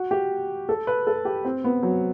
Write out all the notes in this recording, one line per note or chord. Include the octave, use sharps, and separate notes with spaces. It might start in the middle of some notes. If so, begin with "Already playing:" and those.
Already playing: F#4
G4
A4
B4
A4
G4
C4
B3
F#3